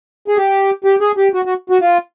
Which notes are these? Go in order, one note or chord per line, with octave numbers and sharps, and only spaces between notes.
G#4
G4
G4
G#4
G4
F#4
F#4
F#4
F4